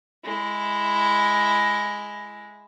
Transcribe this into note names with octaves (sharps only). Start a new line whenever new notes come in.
G#3 E4